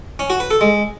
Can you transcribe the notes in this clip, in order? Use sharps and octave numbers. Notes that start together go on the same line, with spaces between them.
C#4
F#4
B4
A4
G#3